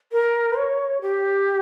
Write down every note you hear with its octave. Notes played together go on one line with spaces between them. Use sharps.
A#4
C#5
G4